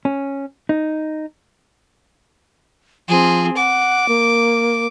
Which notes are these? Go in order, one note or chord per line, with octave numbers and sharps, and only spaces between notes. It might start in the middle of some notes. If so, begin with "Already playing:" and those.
C#4
D#4
F3 C4 G#4
F#5 D6
A#3